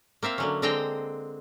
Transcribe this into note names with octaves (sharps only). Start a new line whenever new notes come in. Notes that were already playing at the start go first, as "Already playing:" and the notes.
A#3 C4 E5 F5
D3 F#3 C#4
D3 G#3 C4 D#5 G5 A#5